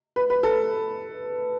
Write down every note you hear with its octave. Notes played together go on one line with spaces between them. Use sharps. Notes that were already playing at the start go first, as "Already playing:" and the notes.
B4
B4
A4